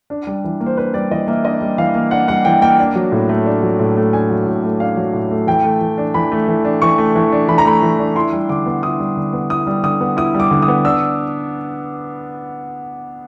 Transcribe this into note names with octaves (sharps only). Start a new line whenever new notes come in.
D4
G3
E3
A#3
C5
D4 B4
G3 D5
E3 D#5
A#3 E5
D4 D#5
G3
E3 F5
A#3
D4 F#5
G3 F#5
E3 G5
A#3 G5
D4
F#3
A2
A3
D4
F#3
A2
A3
D4 G#5
F#3
A2
A3
D4 F5
F#3
A2
A3
E3 G5
A3
E3
D4
E3 B5
A3
E3
D4
E3 C#6
A3
E3
D4
E3 B5
A#5
A3 B5
E3
D4
E4 C6
G3
D3 D6
B3
E4 D#6
G3
D3
B3
E4 D#6
G3
D3 D#6
B3
E4 D#6
G3
D6
D3
D#6
B3
D4 E6